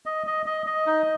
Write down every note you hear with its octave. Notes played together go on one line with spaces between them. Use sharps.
D#5
D#5
D#5
D#5
D#4